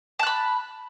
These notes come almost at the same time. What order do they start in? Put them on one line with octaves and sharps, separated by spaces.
A5 F#6 B5